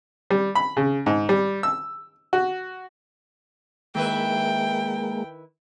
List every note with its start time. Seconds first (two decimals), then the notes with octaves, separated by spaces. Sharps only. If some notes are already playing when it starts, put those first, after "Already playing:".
0.30 G3
0.55 B5
0.77 C#3
1.06 G#2
1.29 G3
1.63 E6
2.33 F#4
3.95 D#3 G#3 A#3 E4 B4 G5